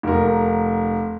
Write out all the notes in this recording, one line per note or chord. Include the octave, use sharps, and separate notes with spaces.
F1 A#4